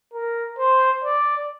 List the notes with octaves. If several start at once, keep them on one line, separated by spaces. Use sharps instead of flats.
A#4
C5
D5